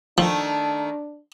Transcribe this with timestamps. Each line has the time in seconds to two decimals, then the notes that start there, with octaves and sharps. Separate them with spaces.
0.18 D#3 F3 A3 D4